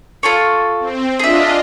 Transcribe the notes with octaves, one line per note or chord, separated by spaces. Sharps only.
F4 A4 C#5
C4
D4 F4 G#4 D#5 E5